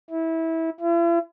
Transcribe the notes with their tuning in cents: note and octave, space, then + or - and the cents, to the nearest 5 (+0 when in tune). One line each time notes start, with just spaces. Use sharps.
E4 -20
E4 +45